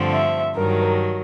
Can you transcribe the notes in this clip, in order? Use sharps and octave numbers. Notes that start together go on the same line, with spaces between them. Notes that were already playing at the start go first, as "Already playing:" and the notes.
Already playing: G2 D3 F3 A3 C4
E5
G2 D#3 F#3 A#4